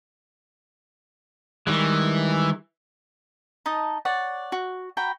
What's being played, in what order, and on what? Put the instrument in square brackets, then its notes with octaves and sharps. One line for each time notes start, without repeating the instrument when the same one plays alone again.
[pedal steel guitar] D#3 G3 G#3 [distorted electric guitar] E3
[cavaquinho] D#4 D#5 A5
C#5 D5 F#5
F#4
F#4 G5 A#5 B5